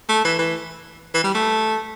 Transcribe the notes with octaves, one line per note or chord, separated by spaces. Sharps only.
A3
E3
E3
E3
G3
A3